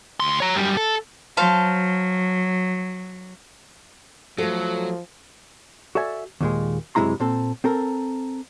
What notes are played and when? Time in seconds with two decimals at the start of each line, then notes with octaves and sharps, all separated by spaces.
0.20 D2 C6
0.40 C#5 A#5
0.55 F#2 G3
0.77 A4
1.37 F#3 C5 F5 A5
4.38 F3 F#3 A3 A4
5.95 F#4 A4 D5 E5 G#5
6.41 D#2 A#2 G#3
6.95 F#2 C3 G#3 E4 A#5 C6
7.20 A#2 C4 A4
7.64 C4 A4 A#4